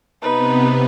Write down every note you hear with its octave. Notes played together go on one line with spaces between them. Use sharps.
C3 B3 D#4 B4